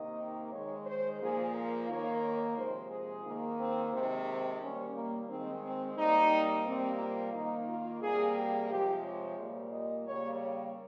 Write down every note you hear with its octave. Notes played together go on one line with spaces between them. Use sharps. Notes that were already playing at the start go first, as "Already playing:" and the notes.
Already playing: C3 D#3 A#3 D#5
D#3 G#3 C#5
C5
A#2 F3 A#3 G#4
A#4
D#3 A#3 C#5
C#5
C3 F3 G#3 C5
G#4
D#3 A#3
C4
C3 D#3 G#3 C4
C4
D#3 G3 A#3 C#4
A#3
D#3 G#3 C4
C4
C3 G3 A#3 D#4
C3 G3 A#3 C4
F4
D#3 A#3 D#4
F4
C3 G3 A#3 G#4
G4
C3 F3 G#3 G4
C#5
A#2 G3 A#3
D#5
C#3 G3 A#3 C#5
C#5